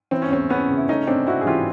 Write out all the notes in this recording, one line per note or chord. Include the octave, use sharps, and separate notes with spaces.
E3 C4
C#4
E2 C4
E2 B3 C#4
C#3
E4
A3 C#4 D#4
C3 C4 D4
C3 E4 F#4
G#4
E3 F4 G4